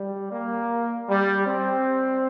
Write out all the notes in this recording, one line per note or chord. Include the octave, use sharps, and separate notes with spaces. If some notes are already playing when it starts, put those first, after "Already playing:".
Already playing: G3
A#3
G3
C4